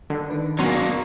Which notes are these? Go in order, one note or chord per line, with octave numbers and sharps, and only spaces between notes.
D3
D#3 D4 B4
F#3 A#3 B3 C#4 A#5 C6 C#6